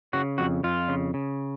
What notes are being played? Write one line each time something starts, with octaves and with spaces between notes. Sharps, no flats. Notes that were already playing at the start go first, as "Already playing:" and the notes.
C#3 F#4
F2 F#4
F2 F4
C#3
C#3